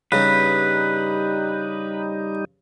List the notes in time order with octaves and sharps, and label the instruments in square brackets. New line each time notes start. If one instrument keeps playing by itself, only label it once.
[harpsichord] G2 C#3 [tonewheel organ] G3 D#4 [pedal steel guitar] B4